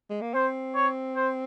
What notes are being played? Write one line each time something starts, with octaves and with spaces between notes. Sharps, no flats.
G#3
A#3
C4 C5
C#5
C5